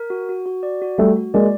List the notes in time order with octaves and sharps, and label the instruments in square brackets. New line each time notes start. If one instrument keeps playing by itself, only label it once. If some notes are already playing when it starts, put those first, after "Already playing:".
Already playing: [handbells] A#4
F#4
F#4
F#4
D5
F#4
[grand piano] G3 A3 [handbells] F#4
[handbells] F#4
[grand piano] G#3 A#3 [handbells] D5